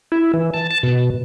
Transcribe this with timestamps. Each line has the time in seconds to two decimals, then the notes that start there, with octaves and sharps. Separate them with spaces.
0.12 E4
0.34 E3
0.54 A5
0.71 A5
0.83 B2